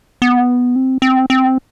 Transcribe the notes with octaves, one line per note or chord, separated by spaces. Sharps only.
B3
C4
C4
C4